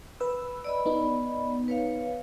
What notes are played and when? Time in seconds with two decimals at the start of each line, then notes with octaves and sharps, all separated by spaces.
0.20 B4 E6
0.64 D5 D#5 B5
0.86 B3 D#4
1.68 B4 C#5 F5